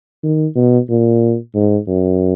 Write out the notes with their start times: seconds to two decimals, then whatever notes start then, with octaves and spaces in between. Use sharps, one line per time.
0.23 D#3
0.56 B2
0.89 A#2
1.55 G#2
1.87 F#2